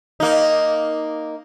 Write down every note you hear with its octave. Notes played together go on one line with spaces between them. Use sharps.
A#3 D#4